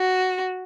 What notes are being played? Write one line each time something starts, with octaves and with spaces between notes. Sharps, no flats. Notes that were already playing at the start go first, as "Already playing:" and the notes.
Already playing: F#4